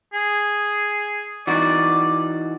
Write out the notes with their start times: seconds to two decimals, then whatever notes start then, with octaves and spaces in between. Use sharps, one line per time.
0.14 G#4
1.47 E3 D#4 F#4 D5